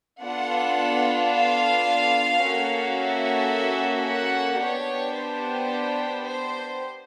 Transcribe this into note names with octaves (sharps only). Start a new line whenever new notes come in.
B3 D4 F4 A4 F#5
F5
A#3 C#4 F#4 A4
E5
F#5
B3 D4 G4 C#5
C5
C5